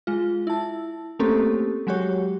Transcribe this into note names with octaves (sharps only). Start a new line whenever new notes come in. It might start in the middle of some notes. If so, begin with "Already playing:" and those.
G#3 F4
E4 A5
A3 A#3 C4 C#4 G4 A4
F#3 G#3 F#4 G4 C#5